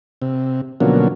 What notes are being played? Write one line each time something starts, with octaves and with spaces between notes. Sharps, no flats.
C3
B2 D3 F3 F#3 A#3 C#4